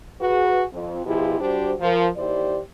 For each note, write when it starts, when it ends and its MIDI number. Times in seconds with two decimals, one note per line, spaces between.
0.21 0.64 66
0.21 0.64 68
0.21 0.64 71
0.73 1.03 41
1.06 1.39 47
1.06 1.39 53
1.06 1.39 64
1.06 1.39 65
1.06 1.39 67
1.06 1.39 68
1.40 1.74 55
1.40 1.74 62
1.40 1.74 66
1.40 1.74 67
1.40 1.74 72
1.80 2.08 53
1.80 2.08 70
2.16 2.59 39
2.16 2.59 64
2.16 2.59 67
2.16 2.59 72
2.16 2.59 74